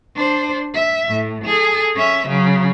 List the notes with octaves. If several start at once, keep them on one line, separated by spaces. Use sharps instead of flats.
D4 C5
E5
A2
G#4 A4
C#4 E5
C#3 F#3